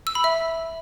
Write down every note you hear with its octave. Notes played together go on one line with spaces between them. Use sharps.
E6
B5
E5